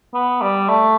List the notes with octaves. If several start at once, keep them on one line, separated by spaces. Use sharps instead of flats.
B3
G3
A3